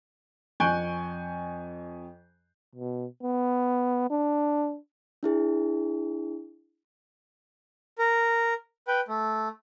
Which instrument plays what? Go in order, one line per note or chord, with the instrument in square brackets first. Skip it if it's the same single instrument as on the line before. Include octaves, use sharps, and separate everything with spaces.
[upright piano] F2 G#5 C#6 F#6 G6 D7
[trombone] B2
B3
D4
[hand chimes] D4 E4 G#4
[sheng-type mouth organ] A#4
B4 G5
A3